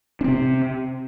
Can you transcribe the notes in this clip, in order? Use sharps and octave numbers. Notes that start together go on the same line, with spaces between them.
C3 C4 D4